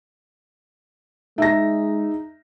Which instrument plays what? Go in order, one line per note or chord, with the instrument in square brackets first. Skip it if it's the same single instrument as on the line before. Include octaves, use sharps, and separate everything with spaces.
[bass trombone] G#3 [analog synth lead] D#4 [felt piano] E5 A#6